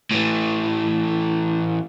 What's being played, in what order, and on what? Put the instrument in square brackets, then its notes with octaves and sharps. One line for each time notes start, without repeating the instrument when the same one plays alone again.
[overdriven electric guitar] A2 E3